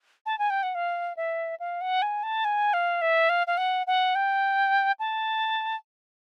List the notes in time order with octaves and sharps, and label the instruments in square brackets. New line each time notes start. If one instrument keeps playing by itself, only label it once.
[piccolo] A5
G#5
G5
F#5
F5
E5
F5
F#5
G#5
A5
G#5
F5
E5
F5
F5
F#5
F#5
G5
A5